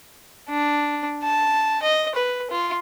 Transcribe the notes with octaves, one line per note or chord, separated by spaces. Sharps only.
D4
A5
D#5
B4
F4